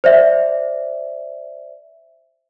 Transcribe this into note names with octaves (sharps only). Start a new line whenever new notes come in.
C5 D5 E5